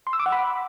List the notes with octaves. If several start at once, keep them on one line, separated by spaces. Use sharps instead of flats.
C6
E6
D6
F#5
B5